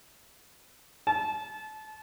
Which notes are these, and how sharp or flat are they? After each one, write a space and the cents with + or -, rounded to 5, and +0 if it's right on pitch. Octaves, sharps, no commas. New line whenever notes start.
A5 -30